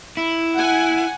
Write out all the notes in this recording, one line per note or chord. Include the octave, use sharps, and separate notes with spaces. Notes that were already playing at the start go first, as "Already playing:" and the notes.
E4
F#5 G#5